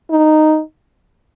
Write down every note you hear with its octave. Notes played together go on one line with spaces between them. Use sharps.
D#4